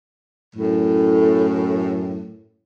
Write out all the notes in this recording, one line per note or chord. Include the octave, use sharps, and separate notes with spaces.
F#2 A2